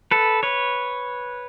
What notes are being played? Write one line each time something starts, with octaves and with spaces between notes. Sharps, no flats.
A4 B4
B4 C#5